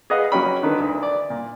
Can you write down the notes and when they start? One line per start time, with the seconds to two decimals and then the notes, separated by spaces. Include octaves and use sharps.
0.10 G#4 B4 D#5 F5 F#5
0.32 F#3 A#3 C#4 G5 B5
0.63 D3 D#3 A#4 B4
0.80 D2
1.03 D5
1.30 A#2